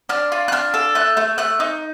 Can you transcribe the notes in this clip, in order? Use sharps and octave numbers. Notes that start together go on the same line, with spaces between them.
D4 F6
F4
F#6
D4 F6
A4
A3 F#6
A3
A3 F#6
D#4